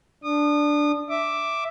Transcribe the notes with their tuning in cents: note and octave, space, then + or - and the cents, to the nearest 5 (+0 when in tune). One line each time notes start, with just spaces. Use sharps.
D4 +0 D#6 -30
E5 +0 D6 +0